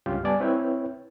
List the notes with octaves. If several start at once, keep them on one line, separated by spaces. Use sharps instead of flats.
C#2 G2 C#4 F4 G4
G3 B3 D5 G#5 A5
C4 E4 B4 C#5 E5 G5